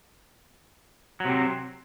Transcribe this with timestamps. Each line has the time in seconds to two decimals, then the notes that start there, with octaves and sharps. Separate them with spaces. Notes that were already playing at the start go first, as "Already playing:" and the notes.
1.20 F#3
1.25 C3
1.30 C4